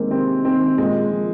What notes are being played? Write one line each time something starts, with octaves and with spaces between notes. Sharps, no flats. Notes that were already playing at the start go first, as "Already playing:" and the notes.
Already playing: C3 D#3 G#3 A#3 C4
C3 C4
D#3 C4
A#2 G#3
F3